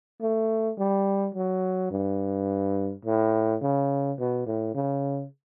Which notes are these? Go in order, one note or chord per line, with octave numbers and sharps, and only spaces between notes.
A3
G3
F#3
G2
A2
C#3
B2
A2
C#3